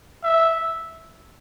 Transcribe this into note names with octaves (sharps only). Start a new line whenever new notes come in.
E5